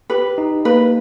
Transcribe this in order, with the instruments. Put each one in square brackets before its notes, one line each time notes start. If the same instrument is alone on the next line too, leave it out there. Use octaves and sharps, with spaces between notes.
[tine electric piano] G4 [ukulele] B4
[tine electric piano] D#4
[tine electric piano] A#3 [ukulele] B4